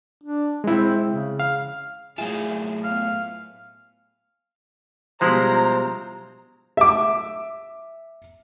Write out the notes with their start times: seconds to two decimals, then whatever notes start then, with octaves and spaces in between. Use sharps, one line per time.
0.24 D4
0.64 G#3 C4 E4
1.07 C#3
1.40 F5
2.18 A2 F#3 F4 G#4 E5 G#5 E7
2.84 B3 F5
5.21 B2 F3 G3 G#3 E4 F4 C5 A#5
6.77 E5 D6